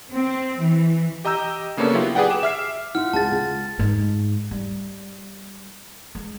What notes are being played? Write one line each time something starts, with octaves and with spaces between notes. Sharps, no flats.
C4
E3
G4 D#5 A#5 E6 G6
C#3 A#3 B3 C#4 D4 A4
F#3 B3 E4 F4 G4
G4 G#4 B4 D5 F#5 G5
D6 E7
E5 F6 C7
E4 F4 F#5 F6
C#2 G#4 A5 A6
C#2
G#2
G3
G#3